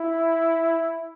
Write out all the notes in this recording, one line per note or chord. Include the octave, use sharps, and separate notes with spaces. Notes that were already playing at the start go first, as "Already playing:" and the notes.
Already playing: E4